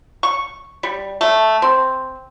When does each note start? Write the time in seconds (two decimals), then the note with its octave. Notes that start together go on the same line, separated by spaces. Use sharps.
0.23 C#6
0.83 G3
1.21 A3
1.62 C4